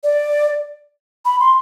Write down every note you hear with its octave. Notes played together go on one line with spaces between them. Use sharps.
D5
B5
C6